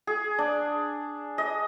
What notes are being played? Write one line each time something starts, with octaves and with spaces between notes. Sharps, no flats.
G#4
D4
D#5